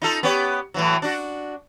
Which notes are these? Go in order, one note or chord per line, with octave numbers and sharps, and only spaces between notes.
D#4 F4 A4
B3 G4 C#5
A2 E3 F#3
D4 F#4